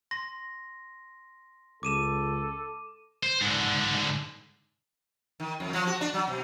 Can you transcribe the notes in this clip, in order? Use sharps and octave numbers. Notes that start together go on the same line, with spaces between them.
C6 A#6
C#2 A4 D6 D#7 E7
C5
G#2 D3
D#3
F2
F3
F#4
D4
F#3
B2